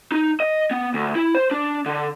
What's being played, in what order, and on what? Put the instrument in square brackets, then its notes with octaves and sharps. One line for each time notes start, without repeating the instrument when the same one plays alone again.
[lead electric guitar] D#4
D#5
B3
D2
E4
C5
D4
D3